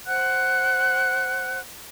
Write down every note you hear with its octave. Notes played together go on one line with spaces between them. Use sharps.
C5 F#5 F#6